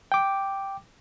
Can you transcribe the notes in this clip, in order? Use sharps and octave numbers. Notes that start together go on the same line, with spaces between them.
G5 D6